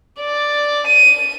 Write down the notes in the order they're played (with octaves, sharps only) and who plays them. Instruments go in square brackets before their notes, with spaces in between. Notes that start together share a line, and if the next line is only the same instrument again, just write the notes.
[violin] D5
D#7